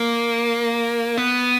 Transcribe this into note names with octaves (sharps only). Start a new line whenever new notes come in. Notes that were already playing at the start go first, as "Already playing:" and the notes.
Already playing: A#3
B3